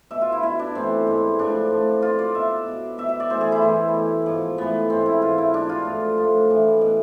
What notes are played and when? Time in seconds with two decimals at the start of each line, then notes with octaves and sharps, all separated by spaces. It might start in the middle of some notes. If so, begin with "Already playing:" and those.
0.11 B2 E5
0.22 F4
0.32 E4
0.43 B2 E4
0.59 D4
0.75 A2 E3 C4
1.07 G#2 E3
1.39 A2 F3 D4
1.71 A2 F3
2.02 B2 F4
2.19 D5
2.35 B2 E5
2.67 B2
2.98 B2 E5
3.09 E5
3.20 D5
3.30 A2 E3 C5
3.41 G#4
3.52 E4
3.62 A2 E3
3.94 B2
4.26 G#2 F3
4.58 A2 E3 B3
4.90 G#2 E3 C4
5.06 E4
5.22 G#2 E3 F4
5.38 E4
5.54 B2 D4
5.69 F4
5.85 A2 F3
6.18 A2 F3
6.49 A2 E3
6.81 B2